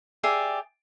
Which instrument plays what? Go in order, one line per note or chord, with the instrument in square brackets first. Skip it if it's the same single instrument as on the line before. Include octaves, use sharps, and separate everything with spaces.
[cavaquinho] G4 G#4 D5 E5